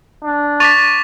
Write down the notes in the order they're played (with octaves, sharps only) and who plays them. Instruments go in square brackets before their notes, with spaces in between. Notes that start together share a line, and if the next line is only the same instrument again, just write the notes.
[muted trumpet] D4
[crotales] C#6 D6 B6 [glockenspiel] A6 F7